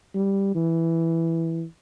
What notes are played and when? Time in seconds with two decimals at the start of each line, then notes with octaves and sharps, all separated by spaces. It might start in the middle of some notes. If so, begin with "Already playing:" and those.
0.14 G3
0.55 E3